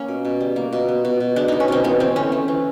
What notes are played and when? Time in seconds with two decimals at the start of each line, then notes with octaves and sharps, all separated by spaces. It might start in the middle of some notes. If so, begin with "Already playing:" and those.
Already playing: A#3 C#4
0.08 B2
0.25 B2
0.41 G3
0.56 A#3
0.73 B2
0.88 B3
1.05 B2
1.20 B2
1.36 G#3 D4
1.48 B3 D#4
1.60 C#4
1.68 B2 C4
1.84 E3 B3
2.00 E3 C4
2.16 A3 C#4
2.32 A3
2.48 E3